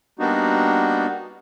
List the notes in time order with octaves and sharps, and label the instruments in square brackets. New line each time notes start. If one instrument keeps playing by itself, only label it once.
[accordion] G3 A#3 B3 D4 D#4 F#4